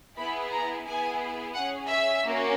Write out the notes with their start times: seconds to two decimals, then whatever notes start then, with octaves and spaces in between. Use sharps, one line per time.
0.17 B3 E4 G#4 B5
0.51 A#5
0.86 B3 E4 G#4 G#5
1.54 C#4 G#4 F#5
1.88 E5
2.23 A#3 C#4 F#4